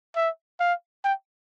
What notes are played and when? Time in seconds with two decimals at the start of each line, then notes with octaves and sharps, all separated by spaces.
0.16 E5
0.60 F5
1.04 G5